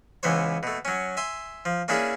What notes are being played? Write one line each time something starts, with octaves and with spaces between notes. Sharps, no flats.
C#2 E3 B3 C5 C#5
B2 A3
F#3 C#4
E5 G#5 C6
F3
A#3 C#4 D4 E4 G#4 E5